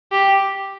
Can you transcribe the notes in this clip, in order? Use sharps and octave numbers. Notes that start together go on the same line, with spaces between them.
G4